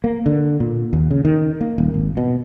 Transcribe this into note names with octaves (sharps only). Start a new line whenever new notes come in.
A#3
D3
A#2
D#2
C#3
D#3
A#3
D#1
G#1
B2